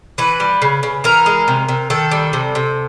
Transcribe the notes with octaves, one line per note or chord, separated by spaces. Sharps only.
E3 B4
G3
C#3
C#3
E3 A#4
G#3
C3
C3
D#3 A4
G3
C3
C3